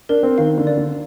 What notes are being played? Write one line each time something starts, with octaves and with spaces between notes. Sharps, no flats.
D4 A#4
C4
D#3 F5
D3
D5
D3